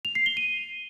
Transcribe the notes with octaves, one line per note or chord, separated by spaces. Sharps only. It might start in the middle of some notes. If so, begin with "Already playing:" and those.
F7
C7
G7
D#7